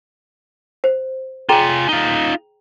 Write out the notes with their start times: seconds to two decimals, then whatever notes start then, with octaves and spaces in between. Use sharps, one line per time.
0.84 C5
1.49 F4 G#4 G5 G#5 A#5
1.89 D#4 F4